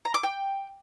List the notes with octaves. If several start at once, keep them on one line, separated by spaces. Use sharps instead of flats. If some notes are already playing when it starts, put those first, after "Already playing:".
A#5
D6
G5